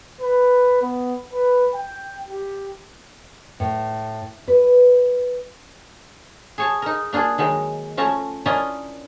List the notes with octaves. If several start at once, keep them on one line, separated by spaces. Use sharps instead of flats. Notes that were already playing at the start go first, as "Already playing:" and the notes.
B4
B3
B4
G5
G4
A2
B4
G#4 C#5 A5
D#4 A#4
A#3 D4 F4 G#4
D#3 F#3 G#3
F3 A3 C#4 A5 A#5
C#4 D4 E4 F4 A#4 D#5